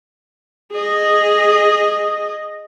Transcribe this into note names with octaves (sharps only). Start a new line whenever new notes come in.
G#4 D#5